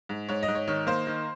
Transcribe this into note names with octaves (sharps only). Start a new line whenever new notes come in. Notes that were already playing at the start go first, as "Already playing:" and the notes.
G#2
G#2 C#5
D#5
G#2
C#5
D#3 C#5
A#3 C5
D#3